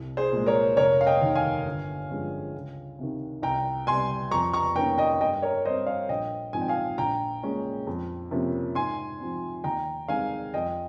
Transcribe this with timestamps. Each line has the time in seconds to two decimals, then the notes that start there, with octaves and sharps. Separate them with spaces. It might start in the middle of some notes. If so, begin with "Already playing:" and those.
Already playing: C2
0.17 G#4 C5
0.32 A#2 G#3
0.46 A#4 C#5
0.77 F1 A#4 C#5
1.01 F5
1.06 D#5 G5
1.22 D#2 D#3
1.35 F5 G#5
1.65 G1
2.09 G2 F3 G#3 C#4
2.55 C#2
2.99 C3 D#3
3.42 C2 G5 A#5
3.87 C3 G3 G#5 C6
4.31 F2 A#5 C#6
4.53 A#5 C#6
4.76 D#3 A#3 C#4 G5 A#5
4.98 D#5 G5
5.21 G2 D#5 G5
5.42 A#4 C#5
5.65 G3 C4 C5 D#5
5.87 C#5 F5
6.09 A#1 D#5 G5
6.53 G#2 F3 C4 G#5
6.61 G5
6.68 F5 G#5
6.98 A#1 G5 A#5
7.43 A#2 G#3 C#4
7.87 F2
8.31 C3 F3 A#3 C#4
8.75 G#2 G#5 C6
9.20 F3 C4
9.64 D#2 G5 A#5
10.08 D#3 G#3 C4 F5 G#5
10.54 F2 D#5 G5